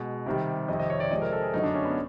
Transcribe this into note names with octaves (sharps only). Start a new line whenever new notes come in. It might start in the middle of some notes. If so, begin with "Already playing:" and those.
Already playing: B2 G#3
C3 D#3 G3
F2 C3 D#3 D#5
D#5
C#5
D5
C3 F3 G#3 D#5
A#4
A4
G#4
F#2 D3 F#3 A3 D#4
D4
C#4
B3